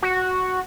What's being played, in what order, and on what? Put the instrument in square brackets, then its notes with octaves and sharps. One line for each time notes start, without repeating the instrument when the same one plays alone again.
[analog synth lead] F#4